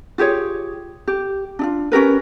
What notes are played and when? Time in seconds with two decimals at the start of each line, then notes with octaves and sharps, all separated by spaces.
0.18 F4 G4 G#4 C#5
1.08 G4
1.59 D4 E4 F4
1.92 C#4 G4 A#4 B4